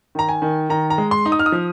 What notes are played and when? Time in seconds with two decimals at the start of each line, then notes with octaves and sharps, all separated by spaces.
0.15 D#3 A#5
0.29 G#5
0.42 D#3
0.70 D#3 A#5
0.90 A#5
0.98 G#3
1.11 C6
1.26 D#4
1.32 D#6
1.39 F6
1.46 D#6
1.52 F3